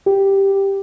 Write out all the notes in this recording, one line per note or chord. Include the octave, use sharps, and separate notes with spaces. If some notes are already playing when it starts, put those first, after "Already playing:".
G4